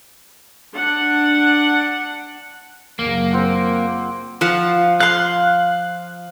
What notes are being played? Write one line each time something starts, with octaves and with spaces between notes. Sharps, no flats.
D4 F#5
F#1 A#3
C4 F4 F#5
F3 F4 F#5
F5 C6 F#6